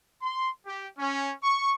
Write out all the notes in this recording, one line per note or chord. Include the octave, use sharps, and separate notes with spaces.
C6
G4
C#4
C#6